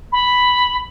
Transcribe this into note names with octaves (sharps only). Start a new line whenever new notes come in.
B5